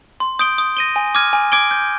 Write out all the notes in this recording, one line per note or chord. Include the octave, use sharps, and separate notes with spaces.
C6
D#6 G6 D7 G7
D#6
A#6 D#7 G7
G#5
D6 F6 G#6 D#7
G#5
D6 G#6 D7 G7
G6